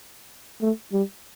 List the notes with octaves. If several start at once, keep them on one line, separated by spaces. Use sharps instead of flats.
A3
G3